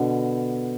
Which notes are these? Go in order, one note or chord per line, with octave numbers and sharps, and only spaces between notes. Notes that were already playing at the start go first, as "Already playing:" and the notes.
Already playing: B2 D3